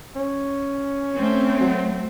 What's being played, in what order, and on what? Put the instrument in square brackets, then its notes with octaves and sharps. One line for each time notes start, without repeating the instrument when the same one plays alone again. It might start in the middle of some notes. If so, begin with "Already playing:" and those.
[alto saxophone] C#4
[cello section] A3 C4
[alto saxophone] F#3